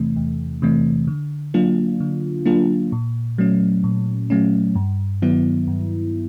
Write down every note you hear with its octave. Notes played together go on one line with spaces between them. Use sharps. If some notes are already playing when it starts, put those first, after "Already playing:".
Already playing: E2 C3 E3 A3
E2
C3 E3 A3
D3
F#3 A#3 D4 F4
D3
F#3 A#3 D4 F4
A#2
F#3 A3 C#4
A#2
F#3 A3 C#4
G2
D#3 F#3 B3 E4
G2